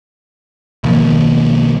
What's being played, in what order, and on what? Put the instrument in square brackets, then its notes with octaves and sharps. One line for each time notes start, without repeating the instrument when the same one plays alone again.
[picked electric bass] B1 D#3 F3 A#3